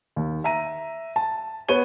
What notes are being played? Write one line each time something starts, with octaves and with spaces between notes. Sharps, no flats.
D#2
E5 A#5 D#7
A5
B3 C#5 D#7 G7